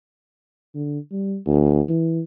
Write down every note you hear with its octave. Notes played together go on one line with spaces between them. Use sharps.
D3
G3
D2
E3